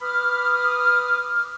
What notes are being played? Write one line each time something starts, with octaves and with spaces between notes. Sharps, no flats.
B4 B5 D6 D#6 F6